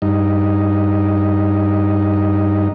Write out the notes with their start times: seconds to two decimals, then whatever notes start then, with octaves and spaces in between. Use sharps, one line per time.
0.02 G2 D#4